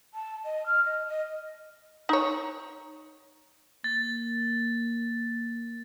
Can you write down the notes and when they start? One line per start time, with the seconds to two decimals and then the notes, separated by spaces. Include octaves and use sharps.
0.14 A5
0.44 D#5
0.66 F6
0.85 D#5
1.08 D#5
2.09 D#4 C#5
3.84 A#3 A6